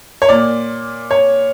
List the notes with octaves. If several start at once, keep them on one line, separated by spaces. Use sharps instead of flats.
C#5
A#2 D5
C#5